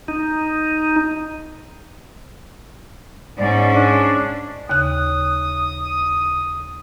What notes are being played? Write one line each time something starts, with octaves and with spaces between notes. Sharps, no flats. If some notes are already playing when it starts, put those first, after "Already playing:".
D#4
G#2 C#4 D5
D4
D#2 C#3 D#6 F#6